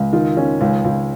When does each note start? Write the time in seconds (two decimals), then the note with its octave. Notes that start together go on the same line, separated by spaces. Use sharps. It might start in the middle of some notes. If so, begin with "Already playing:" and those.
Already playing: C#2
0.13 D#3 F4
0.37 D#3 C#4
0.61 C#2
0.85 C#2